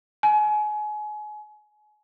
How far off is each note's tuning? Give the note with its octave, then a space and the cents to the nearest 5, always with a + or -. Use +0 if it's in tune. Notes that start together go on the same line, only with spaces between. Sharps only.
G#5 +30